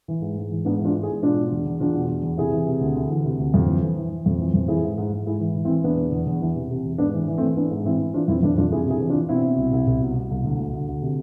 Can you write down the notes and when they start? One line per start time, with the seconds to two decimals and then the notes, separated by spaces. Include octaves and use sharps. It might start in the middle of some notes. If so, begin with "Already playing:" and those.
0.08 E3
0.22 G#2
0.37 G#2
0.51 E3
0.65 G#2 B3 D4
0.79 E3
0.85 D4 F4
0.94 G#2
1.03 E4 G#4
1.09 G#2
1.23 B2 D4 F4
1.38 B2
1.52 E2
1.66 E2
1.80 E2 D4 F4
1.95 B2
2.09 E2
2.23 E2
2.38 C3 E4 G#4
2.53 E3
2.67 C3
2.81 D2
2.95 D2
3.10 E3
3.25 C3
3.40 D2
3.54 F2
3.67 E3
3.82 E3
3.97 E3
4.10 E3
4.26 F2
4.40 E3
4.54 F2
4.68 E3 E4 G#4
4.83 G#2
4.98 G#2
5.12 G#2
5.26 G#2 E4 G#4
5.40 E3
5.55 E3
5.65 C4 E4
5.69 E3
5.84 E2 B3 D4
5.98 E2
6.12 E2
6.27 E2
6.41 E3
6.56 C3
6.70 C3
6.85 E2
6.98 G#2 B3 D4
7.14 E3
7.28 E3
7.38 A3 C4
7.42 E3
7.57 E3 B3 D4
7.71 G#2
7.85 E3 C4 E4
7.99 E3
8.14 E3 D4 F4
8.28 F2 C4 E4
8.42 F2 B3 D4
8.57 F2 D4 F4
8.71 C3 E4 G#4
8.86 C3 E4 G#4
9.01 E3
9.10 D4 F4
9.15 E3
9.29 B2 C4 E4
9.44 B2
9.58 C2
9.73 C2
9.87 C2
10.01 B2
10.16 B2
10.31 C2
10.44 D2
10.59 D2
10.73 D2
10.88 D2
11.02 C3